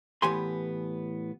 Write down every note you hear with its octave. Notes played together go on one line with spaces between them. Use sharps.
A2 E3 B3 G4 G#5 C6